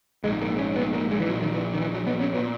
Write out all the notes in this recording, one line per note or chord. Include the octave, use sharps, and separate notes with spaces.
A#1 G#2 G#3
A#3
C#4
B3
A#3
G#3
E3
A#1 A#2 F#3
D#3
E3
D#3
E3
F#3
B3
C#4
A#2 B3